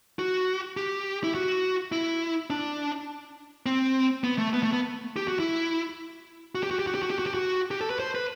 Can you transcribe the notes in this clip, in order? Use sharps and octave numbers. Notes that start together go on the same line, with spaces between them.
F#4
G4
E4
F#4
E4
D4
C4
B3
A3
B3
A3
B3
G4
F#4
E4
F#4
G4
F#4
G4
F#4
G4
F#4
G4
F#4
G4
F#4
G4
A4
B4
C5
B4